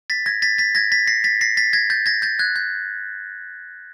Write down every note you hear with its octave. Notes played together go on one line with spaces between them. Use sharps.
A6 B6
G#6 A#6
A6 B6
A6 B6
G#6 A#6
A6 B6
A#6 C7
A6 B6
A#6 C7
A6 B6
G#6 A#6
G6 A6
G#6 A#6
G6 A6
F#6 G#6
G6